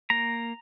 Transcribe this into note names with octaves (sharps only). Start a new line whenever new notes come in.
A#3 A#5